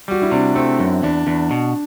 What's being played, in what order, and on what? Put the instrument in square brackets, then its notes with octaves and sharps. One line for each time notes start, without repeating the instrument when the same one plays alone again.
[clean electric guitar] G3 [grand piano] F#4
[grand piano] E4
[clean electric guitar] C3 [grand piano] D4
[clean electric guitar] A3 [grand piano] C4
[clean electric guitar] F#2
[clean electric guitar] E2 [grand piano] D4
[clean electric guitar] E2
B2